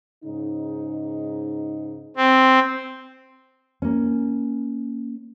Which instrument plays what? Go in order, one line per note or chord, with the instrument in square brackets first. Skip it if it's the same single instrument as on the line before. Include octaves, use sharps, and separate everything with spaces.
[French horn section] G#2 C#3 D#4
[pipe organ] C4
[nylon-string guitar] A#3 C#4